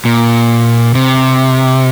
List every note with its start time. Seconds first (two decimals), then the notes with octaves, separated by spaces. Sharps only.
0.05 A#2
0.95 C3